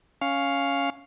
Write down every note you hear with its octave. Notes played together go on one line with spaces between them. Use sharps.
C#4 F5